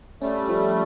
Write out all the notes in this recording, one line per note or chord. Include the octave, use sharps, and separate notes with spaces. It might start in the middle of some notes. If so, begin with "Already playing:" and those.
G3 A3 C#4
F3